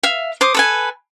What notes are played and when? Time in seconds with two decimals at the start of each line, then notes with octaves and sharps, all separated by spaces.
0.03 E5 F5
0.41 C5 D6 D#6
0.54 A4 B4 G#5